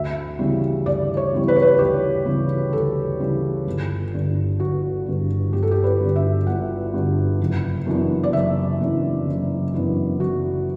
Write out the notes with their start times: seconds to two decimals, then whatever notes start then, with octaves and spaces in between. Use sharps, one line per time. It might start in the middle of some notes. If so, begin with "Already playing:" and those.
Already playing: D2 E5
0.39 C#3 E3 G3
0.86 D2 D5
1.17 C#5
1.33 C#3 E3 G3
1.48 B4
1.56 C#5
1.62 B4
1.79 D2 G4
2.26 C#3 E3 G3
2.73 D2 A4
3.20 C#3 E3 G3
3.67 G1
4.13 G2 D3
4.60 G1 F#4
5.06 G2 D3
5.53 G1 G4
5.62 A4
5.71 G4
5.84 B4
6.00 G2 D3
6.16 E5
6.47 G1 F#5
6.94 G2 D3
7.40 F#1
7.86 F#2 E3 B3 D4
8.23 D5
8.33 F#1 E5
8.80 F#2 E3 B3 D4
9.26 F#1
9.74 F#2 E3 B3 D4
10.20 F#1 F#4